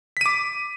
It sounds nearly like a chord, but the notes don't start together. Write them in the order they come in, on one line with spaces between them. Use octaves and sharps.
B6 D#7 D6